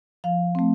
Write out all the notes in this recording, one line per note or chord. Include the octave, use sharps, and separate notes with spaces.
F3 F5
A3 C4